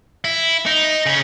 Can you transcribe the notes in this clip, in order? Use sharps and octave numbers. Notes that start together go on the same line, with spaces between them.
E4
D#4
C#3 C#4